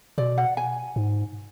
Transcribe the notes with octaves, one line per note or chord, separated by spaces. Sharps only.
B2 D5
F#5
G#5
G#2